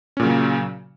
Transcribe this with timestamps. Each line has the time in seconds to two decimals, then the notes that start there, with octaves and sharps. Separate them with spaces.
0.17 C#4
0.20 A#2
0.22 C#3
0.25 F#3